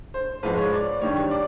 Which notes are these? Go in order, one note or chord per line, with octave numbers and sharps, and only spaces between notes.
C5
G#2 F3 G#3 B4
C#5
D5
G2 D#3 G3 C#5
D5